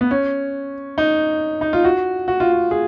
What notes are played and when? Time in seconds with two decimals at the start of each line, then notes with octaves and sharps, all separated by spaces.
0.01 B3
0.11 C#4
0.98 D#4
1.61 D#4
1.73 F4
1.84 F#4
2.28 F#4
2.40 F4
2.52 F#4
2.71 G#4